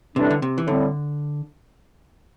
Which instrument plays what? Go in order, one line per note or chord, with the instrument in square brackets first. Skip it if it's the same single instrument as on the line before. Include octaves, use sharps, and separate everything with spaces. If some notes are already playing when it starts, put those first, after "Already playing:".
[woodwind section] A2 E3 G3 D4 [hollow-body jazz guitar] C3
[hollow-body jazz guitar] D3
C3
E3
[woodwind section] A2 G3 C4 [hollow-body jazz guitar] D3